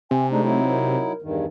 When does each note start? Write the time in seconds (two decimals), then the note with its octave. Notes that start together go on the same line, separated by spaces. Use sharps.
0.11 C3 G#5
0.31 G#3 A3 D4 D#4
0.43 F#3 D#4 E4
0.69 A#4
1.22 E2 G2 D#3